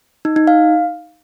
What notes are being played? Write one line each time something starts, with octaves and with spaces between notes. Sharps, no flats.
D#4
D#4
F5